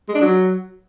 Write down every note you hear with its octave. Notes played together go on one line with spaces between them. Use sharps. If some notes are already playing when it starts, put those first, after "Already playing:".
G#3
D4
F#3